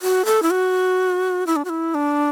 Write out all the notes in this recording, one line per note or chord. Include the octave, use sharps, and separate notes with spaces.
F#4
A4
E4
F#4
E4
D4
F#4
E4
D4